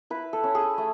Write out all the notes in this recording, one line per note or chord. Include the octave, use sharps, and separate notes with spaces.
E4 B4
A4
C#4
G#4
A3